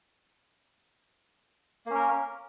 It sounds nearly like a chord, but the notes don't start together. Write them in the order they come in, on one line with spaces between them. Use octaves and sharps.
A#3 C#4 A#4